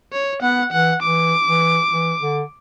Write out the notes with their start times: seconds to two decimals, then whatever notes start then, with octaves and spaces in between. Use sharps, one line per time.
0.13 C#5
0.42 B3 F#5
0.72 E3 F#5
1.02 E3 D6
1.47 E3
1.93 E3
2.21 D3